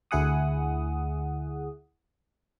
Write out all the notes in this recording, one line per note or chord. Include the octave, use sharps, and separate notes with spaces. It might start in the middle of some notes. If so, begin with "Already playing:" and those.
D2 E4 G#4 F#5 D#6